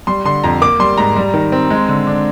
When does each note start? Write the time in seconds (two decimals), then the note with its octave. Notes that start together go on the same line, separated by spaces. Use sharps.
0.07 G3 C6
0.25 D3 C6
0.44 F2 A#5
0.62 A#3 D6
0.80 G3 C6
0.98 G#2 A#5
1.16 G3
1.34 D#3
1.52 C4
1.70 G#3
1.88 D3
2.07 D4